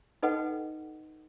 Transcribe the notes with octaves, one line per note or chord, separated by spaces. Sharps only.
D#4 A4 B4 D#5 F#5 G5